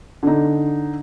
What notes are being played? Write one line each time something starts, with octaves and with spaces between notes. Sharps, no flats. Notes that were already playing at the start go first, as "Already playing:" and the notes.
D3 D#4